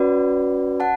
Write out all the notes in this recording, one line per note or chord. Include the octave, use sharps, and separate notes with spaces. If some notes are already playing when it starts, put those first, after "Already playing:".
Already playing: C#4 F#4 B4 D5
F#5 A5